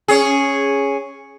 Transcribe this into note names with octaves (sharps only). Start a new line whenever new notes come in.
C#4 G#4